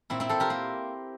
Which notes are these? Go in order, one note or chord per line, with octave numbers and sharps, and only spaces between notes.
A#2 C4 E4
C4 E4
A#2 A4 C5
G4 A#4
A#3